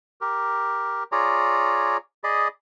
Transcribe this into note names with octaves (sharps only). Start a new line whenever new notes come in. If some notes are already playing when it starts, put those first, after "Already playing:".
G4 A#4
F4 G#4 C#5 D5 A#5
G#4 D5 D#5 B5